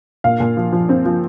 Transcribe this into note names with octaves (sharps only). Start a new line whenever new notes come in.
A#2 F5
A#2
F3
F3
C4
F3